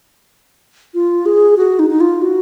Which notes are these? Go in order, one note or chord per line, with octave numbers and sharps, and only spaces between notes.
F4
G#4
F#4
D#4
D#4
F4
F#4